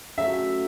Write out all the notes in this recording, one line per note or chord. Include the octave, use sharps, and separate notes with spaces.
C#3 F#3 A3 E5